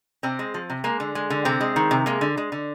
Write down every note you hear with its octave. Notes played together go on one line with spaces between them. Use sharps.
C3 C4
G#3
F3
C3
G#3 A#3
D3
G#3
D3
C3 C4
G#3
D#3
C3
G#3 A#3
D3
G#3
D3